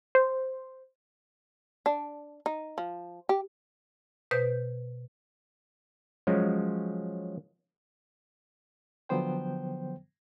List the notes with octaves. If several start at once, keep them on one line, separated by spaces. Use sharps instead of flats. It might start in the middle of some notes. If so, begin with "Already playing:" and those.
C5
D4
D#4
F3
G4
B2 B4 C5 G6
F3 F#3 G#3 C#4
D3 F3 F#3 B3 C5 G5